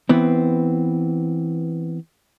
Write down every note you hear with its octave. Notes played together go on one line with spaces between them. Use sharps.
E3 B3 C4